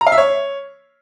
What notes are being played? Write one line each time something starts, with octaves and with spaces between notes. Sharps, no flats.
A#5
F5
E5
C#5